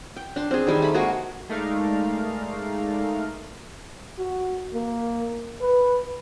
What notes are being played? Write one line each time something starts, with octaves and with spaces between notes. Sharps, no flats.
G5
D4 C6
C4 G#4
D#3 G3 G#4
A3 B5
G#3 A#3 F#4 G#4
G#3 A3 D#4 A#4 D5 F5
F#4
A#3
B4